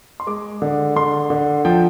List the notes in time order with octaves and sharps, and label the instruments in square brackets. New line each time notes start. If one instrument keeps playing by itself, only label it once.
[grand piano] C6
G#3 D6
D3
D3 C6
D3
F3 G5